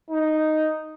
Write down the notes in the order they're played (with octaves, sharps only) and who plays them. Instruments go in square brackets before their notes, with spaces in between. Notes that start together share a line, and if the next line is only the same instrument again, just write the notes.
[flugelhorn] D#4